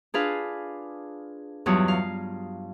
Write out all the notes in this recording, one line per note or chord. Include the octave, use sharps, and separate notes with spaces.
D4 F4 G#4 B4 F5
E2 G2 F#3 F4 F#4 D#6
F5